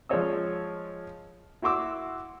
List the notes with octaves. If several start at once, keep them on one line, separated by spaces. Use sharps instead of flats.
F3 G#3 G#4 C#5 D#5 E6
E4 F#4 C6 D6 E6